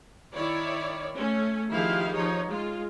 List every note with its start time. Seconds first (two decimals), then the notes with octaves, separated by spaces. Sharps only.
0.35 D#3 E4 C#5 D5
1.16 A3 C#4
1.71 D#3 F3 E4 G4 G#4 F5
2.16 F3 D#4 C#5
2.48 G#3 F4